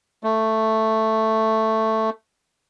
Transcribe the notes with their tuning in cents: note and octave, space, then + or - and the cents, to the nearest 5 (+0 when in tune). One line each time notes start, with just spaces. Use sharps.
A3 +5